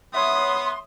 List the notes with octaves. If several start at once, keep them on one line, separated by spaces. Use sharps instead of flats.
B3 C#5 E5 C6 D#6